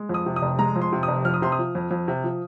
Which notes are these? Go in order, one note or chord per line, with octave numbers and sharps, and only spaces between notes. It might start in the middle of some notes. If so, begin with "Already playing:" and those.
Already playing: G#3
F2 D#6
C3
D#6
F1
G#3 A#5
F2
C6
C3
F1 D#6
F2 F6
D#6
C3 C6
D#6
F3
F2
F2
C3
F3